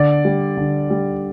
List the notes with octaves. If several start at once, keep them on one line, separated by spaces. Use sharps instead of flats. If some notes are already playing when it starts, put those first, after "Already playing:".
Already playing: D3 D5
G3
D3
G3